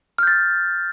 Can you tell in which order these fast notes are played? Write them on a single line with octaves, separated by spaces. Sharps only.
F6 G6 A6